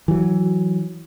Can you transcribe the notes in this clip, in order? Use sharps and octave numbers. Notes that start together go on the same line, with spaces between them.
E3 F#3